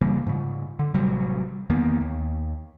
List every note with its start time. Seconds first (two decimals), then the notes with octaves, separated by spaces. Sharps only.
0.01 C#3 E3 G3 A#3
0.27 G#2 C#3
0.79 D3
0.94 A1 C3 F#3 G3
1.70 E2 D#3 A#3 B3
2.01 D#2